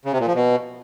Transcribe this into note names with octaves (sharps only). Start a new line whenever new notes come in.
C#3
C3
A#2
F3
B2